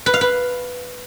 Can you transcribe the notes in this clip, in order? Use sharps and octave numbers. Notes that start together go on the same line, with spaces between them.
B4
F5
B4